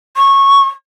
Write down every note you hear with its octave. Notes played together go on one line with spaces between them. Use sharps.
C#6